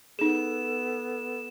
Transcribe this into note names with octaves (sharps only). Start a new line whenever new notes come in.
B3 D#4 G#4 A4 E7